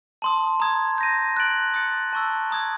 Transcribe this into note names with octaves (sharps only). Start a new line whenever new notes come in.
A5 C6 D#6
A#5 D#6 G#6
G6 A#6 D#7
F#6 A6 D7 F#7
D#6 F#6 A6 C#7
A5 C#6 E6
A#5 D#6 G#6